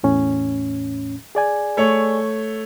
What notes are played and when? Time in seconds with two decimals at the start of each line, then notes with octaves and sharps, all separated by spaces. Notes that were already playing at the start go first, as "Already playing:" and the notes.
0.03 E2 A2 C#4
1.35 G#4 D5 G#5
1.77 A3 C#5